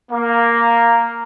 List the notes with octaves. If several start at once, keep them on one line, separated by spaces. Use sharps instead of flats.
A#3